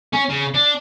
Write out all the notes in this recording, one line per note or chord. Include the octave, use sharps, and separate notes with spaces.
C#4
C#3
D4